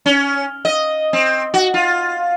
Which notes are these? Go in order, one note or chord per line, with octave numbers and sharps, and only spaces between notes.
C#4
D#5
C4
F#4
F4